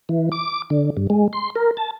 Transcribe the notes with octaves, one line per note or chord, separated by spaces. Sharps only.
E3
D6
D3
G2
G#3
C6
A#4
A5